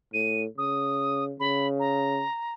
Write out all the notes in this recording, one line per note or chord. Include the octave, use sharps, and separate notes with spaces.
A2 D#7
C#3 D#6
C#3 B5
A#5